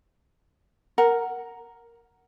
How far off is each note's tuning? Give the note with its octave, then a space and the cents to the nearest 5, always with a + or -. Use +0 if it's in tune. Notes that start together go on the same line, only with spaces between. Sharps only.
A#4 +0 F#5 +0